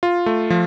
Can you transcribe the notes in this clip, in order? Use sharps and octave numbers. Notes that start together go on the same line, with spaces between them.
F4
A3
F3